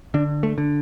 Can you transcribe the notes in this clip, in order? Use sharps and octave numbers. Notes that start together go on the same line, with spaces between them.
D3 D4
A3
D3